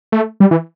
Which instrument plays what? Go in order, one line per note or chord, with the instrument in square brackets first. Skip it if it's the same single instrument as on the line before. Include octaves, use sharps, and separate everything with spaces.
[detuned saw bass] A3
G3
E3